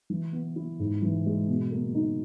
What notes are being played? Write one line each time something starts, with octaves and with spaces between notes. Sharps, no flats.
E3
B3
E4
G#2
E3
G#3
B2
A#3
D#4